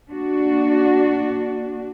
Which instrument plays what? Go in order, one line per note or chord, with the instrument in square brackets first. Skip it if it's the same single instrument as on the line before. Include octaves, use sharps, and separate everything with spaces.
[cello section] A#3 D4 F#4